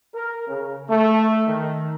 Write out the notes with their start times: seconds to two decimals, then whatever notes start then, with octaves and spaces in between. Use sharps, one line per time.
0.15 A#4
0.48 C#3
0.88 A3
1.46 D#3